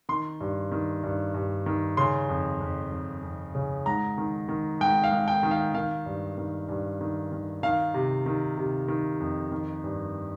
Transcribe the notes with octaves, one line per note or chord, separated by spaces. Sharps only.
D#3 C6
G2
D#3
G2
G2
D#3
C#3 C6
F2
F2
F2
F2
C#3
G#2 A#5
D#3
D#3
G#2 G5
F5
G#2
G5
D#3
F5
D#3 F5
G2
D#3
G2
D#3
D#3
D#3 F5
C3
D#3
C3
D#3
F2
D#3
G2